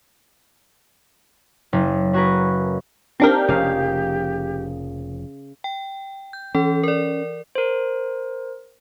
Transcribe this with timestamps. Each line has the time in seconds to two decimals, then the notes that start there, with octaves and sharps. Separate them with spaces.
1.73 F#1
2.13 C#4 F#4 G#4 A#4 B4
3.20 A#3 C4 D4 D#4 G4 A#4
3.48 F1 C#3 F3 F5
5.64 G5
6.33 G6
6.55 E3 C#4 A4
6.83 A#4 D5
7.55 A#4 C5